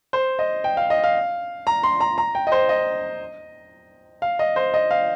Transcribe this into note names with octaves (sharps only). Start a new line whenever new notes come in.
C5
D#5
G5
F5
D#5
F5
A#5
C6
A#5
A#5
G5
D#5
C5
D#5
F5
D#5
C5
D#5
F5